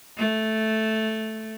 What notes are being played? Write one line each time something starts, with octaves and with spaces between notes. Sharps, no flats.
A3